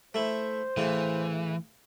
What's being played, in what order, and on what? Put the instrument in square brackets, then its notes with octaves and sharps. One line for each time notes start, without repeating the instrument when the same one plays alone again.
[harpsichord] A3 E4 [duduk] C5
[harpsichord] A2 C#3 [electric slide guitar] E3